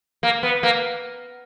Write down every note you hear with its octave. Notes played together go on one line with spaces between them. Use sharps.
A#3
B3
A#3